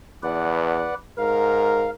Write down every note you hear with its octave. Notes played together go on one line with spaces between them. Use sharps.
E2 B4 D5 F#5
G#2 A#4 F5